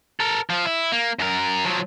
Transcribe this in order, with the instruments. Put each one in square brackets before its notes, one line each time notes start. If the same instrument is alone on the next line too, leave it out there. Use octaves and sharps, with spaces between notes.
[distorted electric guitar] A4 A#4
F3
E4
A#3
F#2 A#4
F3 F#3